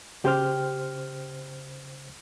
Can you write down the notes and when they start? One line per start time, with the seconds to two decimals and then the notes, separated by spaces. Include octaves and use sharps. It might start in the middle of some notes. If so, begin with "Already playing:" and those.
0.25 C#3 G4 C5 F6